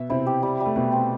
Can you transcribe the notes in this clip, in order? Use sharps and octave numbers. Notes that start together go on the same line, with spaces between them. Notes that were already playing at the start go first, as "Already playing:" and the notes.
Already playing: B2 B3 E5
C3 C4 E4
G4
G3
G3
A3
B2 G3 B3
C4